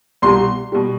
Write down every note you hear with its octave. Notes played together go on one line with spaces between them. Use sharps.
C2 B2 G3 C6
B2 G3